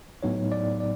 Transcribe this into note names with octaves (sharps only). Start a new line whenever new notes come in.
A2 F#3 B3 D#4 C#5
D5
D5